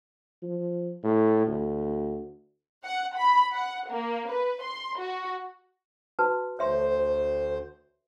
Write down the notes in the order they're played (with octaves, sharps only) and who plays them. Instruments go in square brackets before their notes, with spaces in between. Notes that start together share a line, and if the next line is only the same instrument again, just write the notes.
[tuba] F3
A2
D2
[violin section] F#5
B5
F#5
A#3
B4
C6
F#4
[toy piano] F#4 B4 A5
[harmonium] D2 C5 [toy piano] C#5 E5 C6